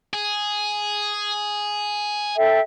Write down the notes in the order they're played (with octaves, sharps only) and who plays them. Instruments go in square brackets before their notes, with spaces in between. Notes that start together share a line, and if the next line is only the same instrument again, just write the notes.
[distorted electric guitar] G#4
[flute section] A4 E5 G5